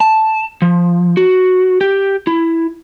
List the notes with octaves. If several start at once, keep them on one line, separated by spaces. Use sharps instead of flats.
A5
F3
F#4
G4
E4